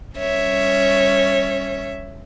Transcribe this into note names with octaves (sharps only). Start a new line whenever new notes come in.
G3 C#4 C#5 E5